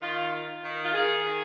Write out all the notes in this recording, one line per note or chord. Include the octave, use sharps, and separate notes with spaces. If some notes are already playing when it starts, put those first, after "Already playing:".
D#3 F4
F4
D#3
F4
D#3 G#4
D#3